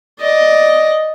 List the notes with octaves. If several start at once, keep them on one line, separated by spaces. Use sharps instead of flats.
D5 D#5